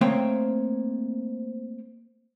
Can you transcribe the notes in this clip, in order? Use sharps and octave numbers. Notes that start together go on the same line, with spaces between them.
A3 A#3 C4 C5 C#5 G5